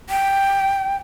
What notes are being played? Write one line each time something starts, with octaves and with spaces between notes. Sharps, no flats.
G5